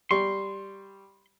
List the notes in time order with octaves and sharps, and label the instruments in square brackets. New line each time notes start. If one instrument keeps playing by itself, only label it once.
[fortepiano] G3 C#6 [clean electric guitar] C6